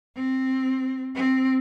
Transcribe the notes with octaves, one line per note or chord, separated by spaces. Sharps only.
C4
C4